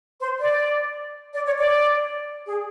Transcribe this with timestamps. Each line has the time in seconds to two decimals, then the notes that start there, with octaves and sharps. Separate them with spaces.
0.20 C5
0.38 D5
1.32 D5
1.45 C#5
1.57 D5
2.46 G#4